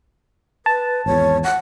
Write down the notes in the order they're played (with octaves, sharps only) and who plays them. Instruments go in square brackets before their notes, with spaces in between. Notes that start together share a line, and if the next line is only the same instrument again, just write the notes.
[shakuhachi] B4 [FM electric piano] A5
[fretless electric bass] G#1 E2 [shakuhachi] C#5
[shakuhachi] F#5